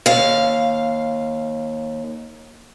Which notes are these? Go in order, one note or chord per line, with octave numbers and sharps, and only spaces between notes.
D#2 F5